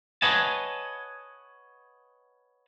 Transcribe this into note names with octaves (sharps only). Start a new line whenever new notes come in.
B4 C#5 D#5 F#5 G#5 A5